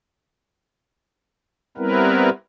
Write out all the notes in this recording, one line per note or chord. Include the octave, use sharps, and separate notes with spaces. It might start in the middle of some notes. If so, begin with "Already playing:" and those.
G3 B3 C4 E4 A#4 B4